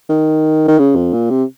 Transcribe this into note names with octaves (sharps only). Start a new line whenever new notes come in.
D#3
D#3
C#3
F2
A#2
C3